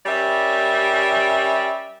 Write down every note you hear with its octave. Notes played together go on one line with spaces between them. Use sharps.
G3 C#4 A#4 D5 E5